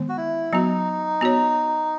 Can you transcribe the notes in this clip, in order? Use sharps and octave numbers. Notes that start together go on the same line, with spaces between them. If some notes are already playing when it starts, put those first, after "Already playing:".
Already playing: D#3 G#3 B3
F#4
E4
F#3 B3 D#4 F#4
B3 F#4 C#5